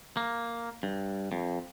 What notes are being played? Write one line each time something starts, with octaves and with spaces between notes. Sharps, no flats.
A#3
G2
F2